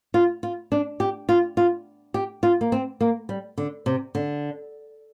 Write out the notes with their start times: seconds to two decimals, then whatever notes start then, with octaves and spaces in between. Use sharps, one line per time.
0.14 F4
0.43 F4
0.72 D4
1.00 G4
1.29 F4
1.57 F4
2.14 G4
2.43 F4
2.61 A#3
2.72 C4
3.01 A#3
3.29 G3
3.58 D3
3.86 C3
4.15 D3